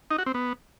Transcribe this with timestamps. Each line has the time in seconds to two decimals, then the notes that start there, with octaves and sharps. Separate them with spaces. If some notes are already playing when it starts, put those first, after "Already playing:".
0.11 D#4
0.18 F#4
0.26 C4
0.34 B3